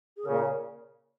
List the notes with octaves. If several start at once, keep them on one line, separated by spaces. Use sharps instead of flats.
G#4
A#2 C#3 A#4